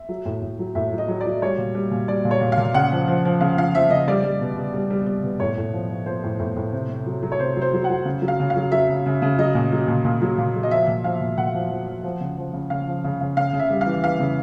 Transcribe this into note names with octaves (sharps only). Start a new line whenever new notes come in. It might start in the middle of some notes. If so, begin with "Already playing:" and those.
Already playing: E5
F#3
A2
A2
F#3
A2 E5
F#3
D#5
F#3
D5
F#3
G3 C#5
A#2
G3
A#2
G3 D5
A#2
C#5
A#2
F5
A#2
C#3 F#5
F3
F3
F3
C#3 F5
F3 F5
F3 E5
C#3 D#5
G3 D5
G3
B2
B2
G3
G3
G3
B2
A2 C#5
A2
F3
F3
F3 C5
A2
A2
A2
C3
C3
F#3
F#3
C#5
C3 C5
F#3
C5
F#3
F#5
F#3
C#3
F#3
F5
C#3
F5
F#3
F#3 E5
C#3
C#3
C#3
F#3 D#5
A#2
F#3
A#2
A#2
F#3
A#2
F#3
D#5
F3 E5
A#2
F3 F5
A#2
A#2 F#5
F3
F3
F3
F3
C#3
F3
C#3
C#3 F5
F3
C#3
C#3
C#3 F5
C#3
E5
G3
F5
E3
E3 F5
C#3